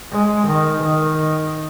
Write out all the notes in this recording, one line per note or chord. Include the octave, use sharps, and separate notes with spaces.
G#3
D#3
D#3